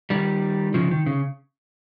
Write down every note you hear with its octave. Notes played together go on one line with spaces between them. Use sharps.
D#3 G3
C#3 F3
D#3
C#3